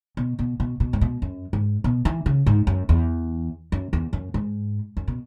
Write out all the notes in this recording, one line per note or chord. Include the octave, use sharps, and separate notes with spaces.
B2
B2
B2
B2
G#2
B2
F#2
G#2
B2
E3
C#3
G#2
F#2
E2
F#2
E2
F#2
G#2
F#2
B2